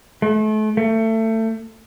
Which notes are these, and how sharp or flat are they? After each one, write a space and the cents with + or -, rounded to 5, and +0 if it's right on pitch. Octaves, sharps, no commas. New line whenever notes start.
A3 -35
A3 +25